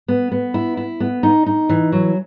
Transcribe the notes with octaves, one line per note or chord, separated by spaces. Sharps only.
B3
B3
E4
E4
B3
D#4
D#4
E3
F#3